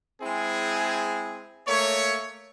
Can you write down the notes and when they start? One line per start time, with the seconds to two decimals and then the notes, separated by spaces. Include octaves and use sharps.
0.21 G#3 C4 E4 G#4
1.67 A3 A#3 C#5